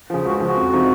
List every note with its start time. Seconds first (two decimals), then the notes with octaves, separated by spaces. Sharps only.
0.10 C#3 F3
0.25 C#2 F#4
0.40 C#3 F3
0.46 F#4
0.57 F2
0.72 C3 F3 C4 D#4